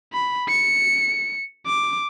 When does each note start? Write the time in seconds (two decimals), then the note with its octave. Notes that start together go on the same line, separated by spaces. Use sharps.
0.13 B5
0.49 C#7
1.66 D6